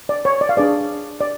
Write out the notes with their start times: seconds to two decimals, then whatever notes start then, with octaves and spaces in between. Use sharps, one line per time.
0.09 D5
0.25 C#5
0.41 D5
0.49 F5
0.57 D4 G#4 B4 D5
1.21 D5